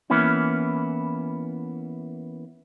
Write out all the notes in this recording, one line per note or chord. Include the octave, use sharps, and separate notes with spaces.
E3 A#3 B3 C#4 E4